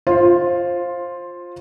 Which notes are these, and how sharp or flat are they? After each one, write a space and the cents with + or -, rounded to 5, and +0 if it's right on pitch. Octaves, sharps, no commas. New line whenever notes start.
F4 +5 C5 +20